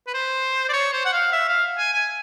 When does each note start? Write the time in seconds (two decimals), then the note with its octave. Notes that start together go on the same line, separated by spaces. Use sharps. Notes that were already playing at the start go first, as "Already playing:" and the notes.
0.07 B4
0.14 C5
0.69 D5
0.73 C#5
0.93 C5
1.05 F#5
1.13 F5
1.32 E5
1.49 F5
1.78 G#5
1.93 G#5